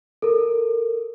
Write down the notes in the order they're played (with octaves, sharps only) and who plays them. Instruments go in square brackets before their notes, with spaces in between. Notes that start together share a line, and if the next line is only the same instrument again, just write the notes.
[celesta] A4 A#4